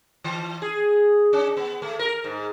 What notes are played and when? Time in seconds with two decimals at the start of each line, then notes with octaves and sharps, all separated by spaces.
0.24 E3
0.62 G#4
1.33 C#4
1.57 B3
1.82 A3
1.99 A#4
2.24 G#2